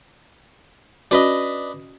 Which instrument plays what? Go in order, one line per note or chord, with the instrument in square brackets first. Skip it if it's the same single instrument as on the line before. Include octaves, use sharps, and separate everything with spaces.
[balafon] C#4 F#4 [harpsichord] D4 B4 D#5